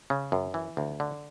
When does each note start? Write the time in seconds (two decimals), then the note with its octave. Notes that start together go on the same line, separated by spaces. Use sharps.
0.10 C#3
0.32 F#2
0.54 E3
0.77 D2
1.00 D3